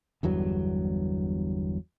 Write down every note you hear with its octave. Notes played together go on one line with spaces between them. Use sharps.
G1 E2 G2 F#3